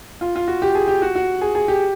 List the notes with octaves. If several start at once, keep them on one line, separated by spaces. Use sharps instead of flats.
F4
F4
F#4
G4
G#4
G4
F#4
F#4
G#4
G#4
G4